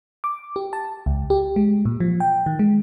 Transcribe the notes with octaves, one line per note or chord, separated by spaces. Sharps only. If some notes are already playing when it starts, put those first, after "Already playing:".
D6
G4
A5
C#2
G4
G#3
A#2
F3
G5
D#3
G#3